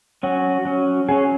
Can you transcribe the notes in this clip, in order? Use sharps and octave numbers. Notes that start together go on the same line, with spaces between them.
F#3 C#4 F#4
F#3 C#4
F#3 C#4 G#4